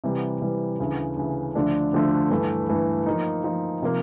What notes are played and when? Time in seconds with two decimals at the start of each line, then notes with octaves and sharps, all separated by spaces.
0.04 C3 E3 G3
0.42 C3 E3 G3
0.79 D2 C#3 E3
1.17 D2 C#3 E3
1.55 D2 D3 F3 A3 D4
1.93 D2 D3 F3 A3 D4
2.30 G2 E3 A3
2.69 G2 E3 A3
3.06 F3 A#3 D#4
3.44 F3 A#3 D#4
3.82 C3 F3 A#3 D#4